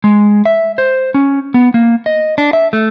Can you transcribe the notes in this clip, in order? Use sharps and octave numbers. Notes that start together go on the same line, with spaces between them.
G#3
E5
C5
C#4
B3
A#3
D#5
D4
E5
A3